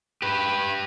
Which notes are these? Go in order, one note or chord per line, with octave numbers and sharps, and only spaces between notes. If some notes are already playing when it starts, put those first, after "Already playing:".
G4 B4